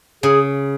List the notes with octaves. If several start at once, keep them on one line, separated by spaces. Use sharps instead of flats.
C#3 G#4